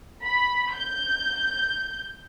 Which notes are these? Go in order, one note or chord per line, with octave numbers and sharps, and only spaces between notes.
B5
G6